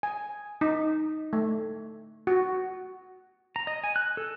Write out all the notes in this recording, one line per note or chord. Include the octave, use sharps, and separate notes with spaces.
G#5
D#4
A3
F#4
A#5
D#5
G#5
F#6
A4